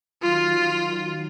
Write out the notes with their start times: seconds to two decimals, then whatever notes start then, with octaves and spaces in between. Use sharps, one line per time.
0.21 D#3 F#3 F4